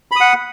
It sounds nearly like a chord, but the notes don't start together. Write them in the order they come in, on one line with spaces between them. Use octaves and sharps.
B5 D#6 F#5